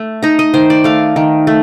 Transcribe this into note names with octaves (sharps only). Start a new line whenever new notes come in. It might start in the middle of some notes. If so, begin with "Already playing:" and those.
Already playing: A3
D#4 A#5
D#5
D#3 C5
D5
A3 F5
D#3
A3